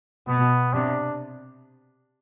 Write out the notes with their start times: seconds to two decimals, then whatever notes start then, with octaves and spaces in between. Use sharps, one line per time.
0.27 B2 B3
0.72 C3 D4